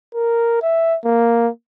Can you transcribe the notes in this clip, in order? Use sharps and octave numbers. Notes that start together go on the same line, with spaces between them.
A#4
E5
A#3